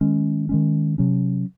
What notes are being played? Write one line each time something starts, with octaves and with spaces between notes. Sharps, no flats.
D#3 G#3 C#4
D#3 G#3 C#4
C3 F#3 C#4